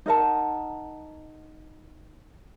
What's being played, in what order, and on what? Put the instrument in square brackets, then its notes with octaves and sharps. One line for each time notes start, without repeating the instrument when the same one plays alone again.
[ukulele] D#4 A#4 F#5 A5